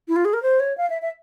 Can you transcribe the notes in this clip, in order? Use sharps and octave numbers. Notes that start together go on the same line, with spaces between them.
E4
F4
G#4
A#4
C5
C#5
F5
E5
E5